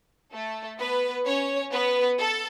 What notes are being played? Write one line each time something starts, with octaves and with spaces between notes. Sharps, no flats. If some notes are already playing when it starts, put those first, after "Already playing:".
A3 A4
B3 B4
C#4 C#5
B3 B4
A4